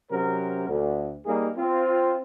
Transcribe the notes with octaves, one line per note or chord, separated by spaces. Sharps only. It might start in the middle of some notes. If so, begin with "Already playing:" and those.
C3 F#3 C#4 A#4 C5
D2
G3 A#3 D#4 G#4
C4 F4